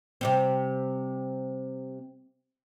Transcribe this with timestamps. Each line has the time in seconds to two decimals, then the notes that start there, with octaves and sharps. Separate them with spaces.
0.21 C3 G3 C4